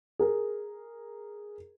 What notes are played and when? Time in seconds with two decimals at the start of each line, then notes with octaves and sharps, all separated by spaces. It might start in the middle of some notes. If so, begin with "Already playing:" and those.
0.19 G#4 A#4